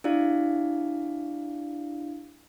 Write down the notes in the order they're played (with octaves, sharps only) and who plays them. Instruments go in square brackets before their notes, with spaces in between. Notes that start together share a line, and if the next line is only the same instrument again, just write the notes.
[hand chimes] D4 E4 G4 D5 F5